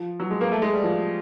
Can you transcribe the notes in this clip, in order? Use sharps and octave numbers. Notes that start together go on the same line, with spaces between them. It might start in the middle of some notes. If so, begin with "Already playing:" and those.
Already playing: F3
F#3
G#3
A#3
A3
G#3
G3
F3